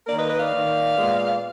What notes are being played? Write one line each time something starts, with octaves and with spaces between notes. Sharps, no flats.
D#3 A#3 A#4 D5
B4 D#5
B4 D#5
D5 F5
D#3 A#3
A#2 G#3 B3